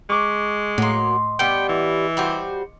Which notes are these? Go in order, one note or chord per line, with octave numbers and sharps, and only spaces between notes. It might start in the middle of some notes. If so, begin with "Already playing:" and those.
G#3 C#6 D6 B6
A2 F#3 A#3 D#5 C6
G3 B3 G5
E3
G3 F#4 C5